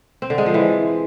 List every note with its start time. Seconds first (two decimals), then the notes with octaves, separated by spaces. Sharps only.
0.22 C4
0.30 D3
0.38 G#3
0.46 F3
0.54 E3